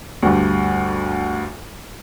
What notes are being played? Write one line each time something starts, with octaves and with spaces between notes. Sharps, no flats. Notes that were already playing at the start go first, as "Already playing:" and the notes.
D2 G2